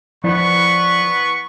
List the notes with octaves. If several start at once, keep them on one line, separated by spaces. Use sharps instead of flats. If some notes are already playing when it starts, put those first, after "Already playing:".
F3 B3 E4 B4 D5 C#6